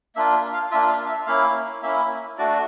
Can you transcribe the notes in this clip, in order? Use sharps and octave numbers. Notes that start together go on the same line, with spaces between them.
A#3 D4 F4 E5
F5
A#3 D4 F4 E5
F5
E5
A#3 C#4 E4 F5
A#3 C#4 E4 E5
A3 D4 F#4 D5